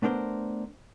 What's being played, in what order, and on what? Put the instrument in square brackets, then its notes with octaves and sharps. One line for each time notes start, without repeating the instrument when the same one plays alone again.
[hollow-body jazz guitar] A3 B3 D4 A#4 C5